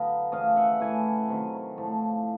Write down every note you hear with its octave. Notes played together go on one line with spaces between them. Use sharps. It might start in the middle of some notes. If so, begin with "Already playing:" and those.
Already playing: D3 F#3 B3 D#5 F5
C#3 E3 A3 C#4 D#5 F5
E5 F#5
A2 E3 A3 F#5 G#5
C3 D#3 F#3
A2 F3 A3